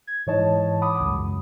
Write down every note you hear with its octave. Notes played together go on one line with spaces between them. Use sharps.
G#6
G#2 E3 C#5 D#5 A5
F#5 B5 D6 D#6
C#2 F#2